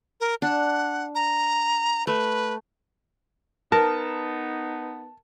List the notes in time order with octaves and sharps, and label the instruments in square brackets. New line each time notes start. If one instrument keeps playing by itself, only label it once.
[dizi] A#4
[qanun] D4 [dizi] F#5
[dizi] A#5
[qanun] A3 [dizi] B4
[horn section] B3 D#4 [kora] A#4 [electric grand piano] A5